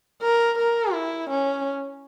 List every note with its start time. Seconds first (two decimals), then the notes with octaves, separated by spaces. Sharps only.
0.22 A#4
0.58 A#4
0.93 E4
1.30 C#4